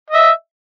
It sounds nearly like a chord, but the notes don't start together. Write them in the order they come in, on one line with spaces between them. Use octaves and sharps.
D#5 E5 E6